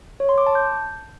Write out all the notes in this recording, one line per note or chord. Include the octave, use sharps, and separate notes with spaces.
C#5
C6
D6
A5
G6